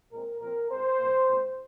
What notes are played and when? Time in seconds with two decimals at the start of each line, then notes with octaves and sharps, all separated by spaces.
0.11 A#2 G#3 C4 A#4
0.41 A#2 F3 C4 A#4
0.70 G#2 G#3 C4 C5
0.99 C2 A#2 A#3
1.27 A#2 G#3 C4